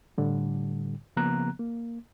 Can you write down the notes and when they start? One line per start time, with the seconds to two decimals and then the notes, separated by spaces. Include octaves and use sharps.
0.18 A2 D3 G3
1.17 C#3 F3 A#3 B3 A#5 F#6
1.60 A#3